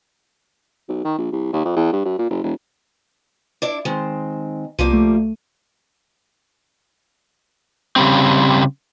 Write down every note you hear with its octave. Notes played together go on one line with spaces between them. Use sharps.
B1
D#3
A#1
C2
D#2
F2
E2
G2
F#2
A#2
F#1
E1
D4 E4 D5
D#3 G#3 C4
C2 F3 G3 A#3 D#7
A3
C#3 G3 C4